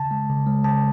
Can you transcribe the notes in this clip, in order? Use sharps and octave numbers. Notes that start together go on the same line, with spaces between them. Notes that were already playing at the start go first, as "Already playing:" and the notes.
Already playing: C#3 A5
G#3
C#3
G#3
C#3 A5